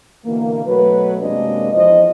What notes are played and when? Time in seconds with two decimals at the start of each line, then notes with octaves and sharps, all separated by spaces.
0.25 B2 D3 E3 A#3
0.66 B2 F#3 A3 B4
1.20 F#2 C3 G#3 A#3 D4 D#5
1.73 E2 F3 E4 C5 D#5